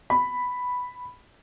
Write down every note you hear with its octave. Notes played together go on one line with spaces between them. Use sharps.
B5